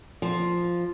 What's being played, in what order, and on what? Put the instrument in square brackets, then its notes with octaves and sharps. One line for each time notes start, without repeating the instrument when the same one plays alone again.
[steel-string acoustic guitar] F3